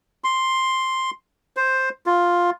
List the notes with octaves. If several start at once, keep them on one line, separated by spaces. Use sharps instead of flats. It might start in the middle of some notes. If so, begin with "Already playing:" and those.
C6
C5
F4